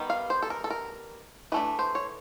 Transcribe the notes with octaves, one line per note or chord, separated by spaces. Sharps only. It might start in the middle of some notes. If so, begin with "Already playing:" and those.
Already playing: D#3 G3 B3
F5
C5
A4
A#4
A4
A#4
E3 A3 D4 B4
C5
C#5